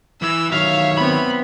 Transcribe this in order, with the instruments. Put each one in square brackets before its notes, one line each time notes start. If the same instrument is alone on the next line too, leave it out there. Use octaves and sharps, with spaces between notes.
[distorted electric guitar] E3 [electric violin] E6
[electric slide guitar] D#3 F#3 [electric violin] C#5 E5 [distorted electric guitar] F5
[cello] B3 C4 [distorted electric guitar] B5